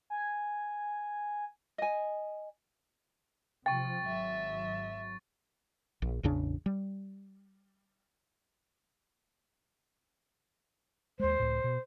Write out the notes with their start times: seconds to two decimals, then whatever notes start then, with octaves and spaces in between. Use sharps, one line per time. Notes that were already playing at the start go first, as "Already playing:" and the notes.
0.10 G#5
1.78 D#5 G#5
3.66 C3 F3 G5 C#6 A6
4.06 G#1 F#3 E5
6.02 A#1
6.23 A1 E2 C#3 D4
6.66 G3
11.20 D#2 G#3 C5
11.40 C#2 A2
11.64 B2